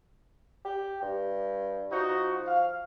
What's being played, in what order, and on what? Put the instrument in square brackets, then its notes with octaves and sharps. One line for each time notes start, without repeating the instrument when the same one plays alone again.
[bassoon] G4
G2
[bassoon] F3 [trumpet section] D#4 F#4
[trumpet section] F5